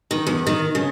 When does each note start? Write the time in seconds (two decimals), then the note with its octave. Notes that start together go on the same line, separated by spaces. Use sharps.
0.11 D#3
0.27 E2
0.47 D#3
0.75 C#3